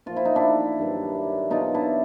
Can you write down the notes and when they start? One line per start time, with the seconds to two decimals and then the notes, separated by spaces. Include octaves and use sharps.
0.06 A#2 F3 F4
0.16 E4
0.25 D#4
0.36 D4 E4
0.79 G2 D#3 F#3
1.50 B2 F#3 D#4 F4
1.74 D4 E4